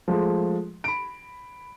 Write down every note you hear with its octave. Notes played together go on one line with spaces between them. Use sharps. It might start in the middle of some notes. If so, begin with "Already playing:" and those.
F3 G#3 A3
B5 D7